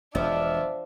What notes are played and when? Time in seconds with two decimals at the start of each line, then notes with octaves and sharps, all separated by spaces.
0.15 E1 F3 D4 E5